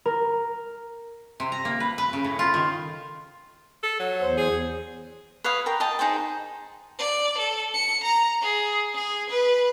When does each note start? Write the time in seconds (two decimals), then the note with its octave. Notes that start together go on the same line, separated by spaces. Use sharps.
0.06 A#4
1.40 C3
1.52 A#5
1.65 A#3
1.80 B4
1.98 B4
2.13 C#3
2.24 A2
2.39 F4
2.54 D#3
3.83 A4
4.00 F#3
4.21 E2 C5
4.37 G#4
5.44 B4 C#5 F5 D#6
5.66 A#4 G5
5.80 D#5 G5 A5
5.99 D#4 G#4 C5 G5
6.99 D5
7.38 A4
7.74 C#7
8.04 A#5
8.42 G#4
8.94 G#4
9.30 B4